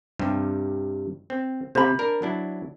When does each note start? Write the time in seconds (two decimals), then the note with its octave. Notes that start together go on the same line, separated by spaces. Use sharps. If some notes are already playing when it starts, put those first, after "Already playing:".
0.19 G2 C3 G3
1.30 C4
1.75 C3 C5 B5
1.99 D4 A#4
2.22 F#3 D4 E4